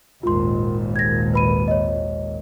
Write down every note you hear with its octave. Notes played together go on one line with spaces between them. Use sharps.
G#1 D#2 A#2 F4 C6
G#6 A#6
B4 B5 D#7
C#5 D#5